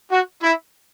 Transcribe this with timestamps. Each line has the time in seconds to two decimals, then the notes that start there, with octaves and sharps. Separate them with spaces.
0.11 F#4
0.43 E4